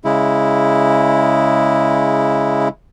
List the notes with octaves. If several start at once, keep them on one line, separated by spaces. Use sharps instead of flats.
C#3 G#3 E4